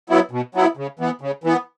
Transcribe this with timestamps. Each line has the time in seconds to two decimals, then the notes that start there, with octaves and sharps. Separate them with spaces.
0.10 F#3 B3 E4
0.31 B2
0.55 F#3 B3 E4
0.77 C#3
0.99 E3 B3
1.21 C#3
1.44 E3 B3